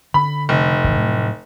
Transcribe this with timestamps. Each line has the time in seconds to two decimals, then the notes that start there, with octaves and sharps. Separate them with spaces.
0.14 D3 B5
0.49 F1
0.84 D#1 G#1 E3
0.97 A2 F#3